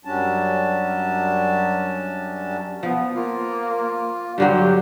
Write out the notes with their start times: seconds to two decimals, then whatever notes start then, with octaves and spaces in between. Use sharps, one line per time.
0.05 F#2 F#3 G3 C#4 D4 A5
2.83 F3 B3
3.15 A#3 F4
4.38 G2 D3 F#3 G4